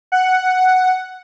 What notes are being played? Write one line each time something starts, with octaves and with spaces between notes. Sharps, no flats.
F#5